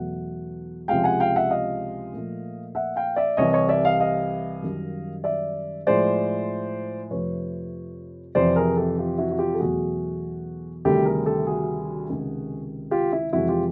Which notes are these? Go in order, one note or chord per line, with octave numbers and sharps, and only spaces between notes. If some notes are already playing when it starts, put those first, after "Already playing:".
Already playing: E2 B2 F#3 A3 F#5
C#2 C3 F3 G#3 F5 G5
F#5 G#5
F5 G5
E5 F#5
D#5 F5
A#2 F3 A3
E5 F#5
F5 G5
D5 E5
C2 C3 E3 C#5 D#5
C#5 D#5
D5 E5
D#5 F5
D#5 F5
F#2 D#3 G3
D5 E5
A2 F3 G#3 C5 D5
F2 C3 F3 A3 B4 C#5
F2 C3 E3 C5 D5
G#4 A#4
G4 A4
F4 G4
E4 F#4
F#4
F4 G4
A4
E2 B2 F#3 A3 F#4 G#4
D2 C3 D#3 G3 G4 A4
G#4 A#4
G4 A4
F#4 G#4
C#2 C3 D#3
F4 G4
E4
F2 C3 E3 G#3 E4 F#4
F4 G4